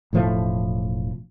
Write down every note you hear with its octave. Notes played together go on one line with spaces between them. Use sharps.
E1 A2 F3 A3